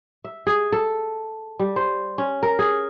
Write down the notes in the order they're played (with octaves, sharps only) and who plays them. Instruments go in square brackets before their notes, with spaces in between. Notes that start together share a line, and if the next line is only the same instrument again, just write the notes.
[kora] E5
G#4
A4
G3
C5
C#4
A#4
G#4